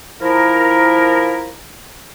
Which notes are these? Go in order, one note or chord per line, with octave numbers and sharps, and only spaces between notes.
F3 E4 A#4